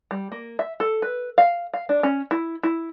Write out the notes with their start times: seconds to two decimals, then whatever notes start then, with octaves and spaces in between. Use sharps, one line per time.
0.11 G3
0.32 A#3
0.59 E5
0.80 A4
1.02 B4
1.38 F5
1.74 F5
1.89 D4
2.03 C#4
2.31 E4
2.63 E4